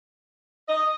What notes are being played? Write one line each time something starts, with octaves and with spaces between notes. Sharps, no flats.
D#5